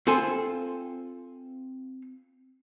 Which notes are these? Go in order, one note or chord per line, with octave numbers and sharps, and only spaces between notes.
C4 F4 A4 C5 G#5